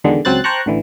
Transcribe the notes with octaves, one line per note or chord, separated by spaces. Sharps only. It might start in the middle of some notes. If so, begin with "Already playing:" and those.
E2 B2 D3 D#3 G#3
C#2 F#3 C4 C5 F#6 A6
C5 G5 A5 A#5 C#6 F#6
A1 D3 E3